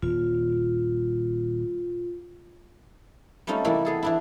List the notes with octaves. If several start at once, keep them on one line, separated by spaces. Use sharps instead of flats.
D#1 F4
G3 A3 C4 C#4 D#4 F4
C3 E3 G3 A#3 E4 F4
B3 G#4 A4
E3 D4 E4